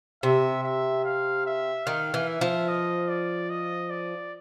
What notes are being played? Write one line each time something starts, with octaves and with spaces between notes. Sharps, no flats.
C3 E5
E5
F5
E5
D#3 F5
E3
E5
F3
D#5
D5
D#5
D5